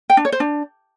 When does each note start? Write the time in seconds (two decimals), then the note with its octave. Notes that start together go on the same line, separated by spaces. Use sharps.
0.10 G5
0.17 D4
0.25 C#5
0.32 C5
0.40 D4